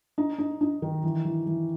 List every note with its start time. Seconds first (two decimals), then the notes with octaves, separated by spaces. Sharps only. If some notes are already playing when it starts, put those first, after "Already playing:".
0.18 D#4
0.39 D#4
0.61 D#4
0.82 D#3
1.03 E3
1.25 E3
1.47 E3